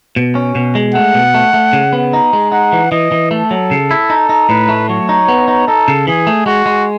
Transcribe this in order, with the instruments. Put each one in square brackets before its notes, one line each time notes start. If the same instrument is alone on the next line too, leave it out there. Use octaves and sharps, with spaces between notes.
[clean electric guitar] B2
C#4
B2
G#3
[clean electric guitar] A3 [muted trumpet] F#5
[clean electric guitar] B2
A3
A3
C#3
B3
D#4
G#3
[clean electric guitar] D#4 [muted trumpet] F#5
[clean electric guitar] E3
[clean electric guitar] E3 [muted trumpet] D#5
[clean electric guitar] E3
[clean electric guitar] A3 [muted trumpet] A4
[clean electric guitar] F#3
C#3
E4
D#4
D#4
[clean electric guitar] A2 [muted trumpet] B4
[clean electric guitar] A3
[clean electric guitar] F#3 [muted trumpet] C#5
[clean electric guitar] D#4
B3
D#4
[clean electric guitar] D#4 [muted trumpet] A4
[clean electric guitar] C#3
[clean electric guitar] E3 [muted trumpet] G#4
[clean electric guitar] A3
[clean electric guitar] G#3 [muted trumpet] F#4
[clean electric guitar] G#3